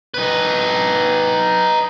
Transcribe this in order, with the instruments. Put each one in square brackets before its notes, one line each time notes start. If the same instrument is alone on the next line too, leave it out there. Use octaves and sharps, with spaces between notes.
[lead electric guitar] D#4 B4